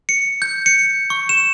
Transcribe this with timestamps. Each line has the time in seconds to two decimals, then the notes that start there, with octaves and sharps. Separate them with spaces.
0.09 C#7
0.42 G6
0.66 C#7
1.10 C#6
1.29 E7